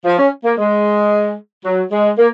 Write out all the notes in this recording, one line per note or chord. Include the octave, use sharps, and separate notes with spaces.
F3
C#4
A#3
G#3
F#3
G#3
A#3